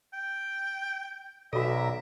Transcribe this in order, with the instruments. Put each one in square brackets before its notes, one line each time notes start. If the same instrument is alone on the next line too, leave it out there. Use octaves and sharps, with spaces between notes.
[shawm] G5
[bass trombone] B1 [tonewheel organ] B2 D5 A#5 [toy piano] F#4 A4 [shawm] E5